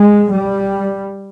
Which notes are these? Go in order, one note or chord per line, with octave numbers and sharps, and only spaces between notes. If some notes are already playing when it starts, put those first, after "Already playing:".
Already playing: G#3
G3